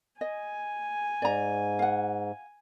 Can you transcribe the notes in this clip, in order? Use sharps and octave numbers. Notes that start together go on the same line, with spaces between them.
D#5 G#5
G#2 D5 A#5
F5 F#5